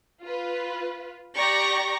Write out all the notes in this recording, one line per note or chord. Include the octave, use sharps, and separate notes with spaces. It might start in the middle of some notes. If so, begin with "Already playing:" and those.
F4 B4
G4 D5 A#5 C#6 D6 A#6